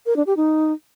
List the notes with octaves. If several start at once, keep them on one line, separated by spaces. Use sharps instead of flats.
A#4
D4
G4
D#4